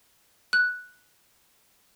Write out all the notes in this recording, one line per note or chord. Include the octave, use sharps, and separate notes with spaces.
F#6